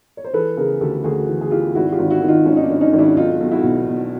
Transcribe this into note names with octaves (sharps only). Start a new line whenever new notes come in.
C#5
C5
E3 A4 B4
C#3 G#4 A#4
D2 G4 A4
D2 F#4 G#4
E3
G#4
E3 F4 G4
G#1 E4 F#4
F4 G4
G#1
E4 F#4
D#3
D#4 F4
G#1 C#4
D#4
D4
G#1
C#4 D#4
G#1
D4 E4
B1 D#4 F4
B1
E4 F#4
B2
B2